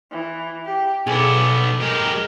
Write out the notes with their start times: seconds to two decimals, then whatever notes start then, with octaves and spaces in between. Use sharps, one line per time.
0.12 E3
0.66 G4
1.07 B1 B3 G#4 A4 D5 D6
1.80 G#3 G4 A#4